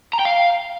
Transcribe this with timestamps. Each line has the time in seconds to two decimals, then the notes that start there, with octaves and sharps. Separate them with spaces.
0.13 A#5
0.19 G5
0.25 F5